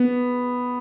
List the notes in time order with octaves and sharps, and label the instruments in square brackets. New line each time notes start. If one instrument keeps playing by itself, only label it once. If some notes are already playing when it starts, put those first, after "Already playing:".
Already playing: [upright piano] B3